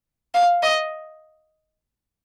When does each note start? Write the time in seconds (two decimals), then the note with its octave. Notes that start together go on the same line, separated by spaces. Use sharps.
0.34 F5
0.63 D#5